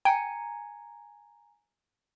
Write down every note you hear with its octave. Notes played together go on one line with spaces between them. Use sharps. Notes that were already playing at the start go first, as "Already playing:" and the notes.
G5 G#5 A#5 G#6